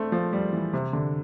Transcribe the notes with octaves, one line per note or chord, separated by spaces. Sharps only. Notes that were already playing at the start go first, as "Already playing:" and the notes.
Already playing: A3 C4 D4
F3
G3
E3
C3
D3